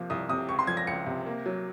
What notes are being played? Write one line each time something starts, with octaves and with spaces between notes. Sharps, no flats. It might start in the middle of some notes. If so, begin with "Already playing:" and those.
Already playing: C3 F3 A#3
C2 D#6
C3 D#6
C#2 C#6
C6
F3 G#6
A#6
C#2 C#7
C3
A#3
F#3